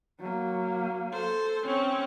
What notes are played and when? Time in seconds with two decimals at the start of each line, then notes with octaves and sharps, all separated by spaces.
0.19 F#3 A#3
1.12 A4 C5
1.66 C4 C#4 C#5